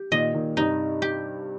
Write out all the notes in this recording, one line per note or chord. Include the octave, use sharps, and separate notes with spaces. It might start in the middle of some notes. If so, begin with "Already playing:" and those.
Already playing: G4
A#2 D#3 D#5
A#2 D#3
G2 C3 D#4
G4